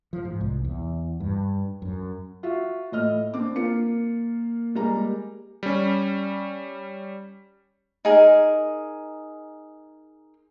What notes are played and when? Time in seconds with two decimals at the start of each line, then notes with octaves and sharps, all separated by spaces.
0.13 F3
0.25 G#2
0.41 C2
0.65 E2
1.20 G2
1.82 F#2
2.43 F4 F#4 E5
2.92 A2 D#5 F6
3.34 C4 D4 D6
3.55 A#3 F4 C#7
4.75 G3 G#3 A#3 A#5
5.63 G3 C#4
8.05 D#4 G#4 A#4